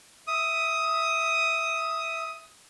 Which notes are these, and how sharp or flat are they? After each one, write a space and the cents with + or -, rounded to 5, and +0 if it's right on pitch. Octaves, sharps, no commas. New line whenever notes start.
E5 +0 D#6 +15